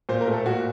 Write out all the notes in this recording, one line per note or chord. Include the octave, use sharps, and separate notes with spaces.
A#2 C5
A#4
A3
A4
A#2 F#4